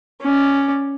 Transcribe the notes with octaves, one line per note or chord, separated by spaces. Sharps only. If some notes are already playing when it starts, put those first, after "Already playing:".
C#4 D5